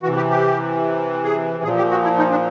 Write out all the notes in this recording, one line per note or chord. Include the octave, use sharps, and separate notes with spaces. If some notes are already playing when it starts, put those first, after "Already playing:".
C3 E3 F#4
G4
G4
G#4
A#2 F3 G#4
G4
F#4
E4
D#4
D4